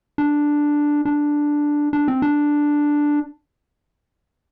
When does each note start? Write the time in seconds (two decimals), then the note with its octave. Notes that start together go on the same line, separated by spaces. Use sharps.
0.18 D4
1.05 D4
1.93 D4
2.08 C4
2.22 D4